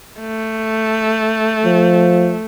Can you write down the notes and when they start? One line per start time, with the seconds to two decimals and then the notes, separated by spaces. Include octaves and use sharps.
0.20 A3
1.65 F3